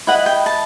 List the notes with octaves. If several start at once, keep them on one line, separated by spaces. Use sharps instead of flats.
E4 B4 D#5 F#5
G5
A5